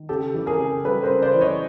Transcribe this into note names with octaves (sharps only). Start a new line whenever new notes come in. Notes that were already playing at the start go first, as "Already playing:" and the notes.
Already playing: D#3
C#3 G4 A4
E3
G#4 A#4
C#3
G3 A4 B4
A#4 C5
C#3
C5 D5
E3
C#5 D#5